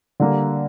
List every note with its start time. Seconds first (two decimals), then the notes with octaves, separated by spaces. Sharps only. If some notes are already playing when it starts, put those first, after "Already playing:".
0.20 D3 G3 A#3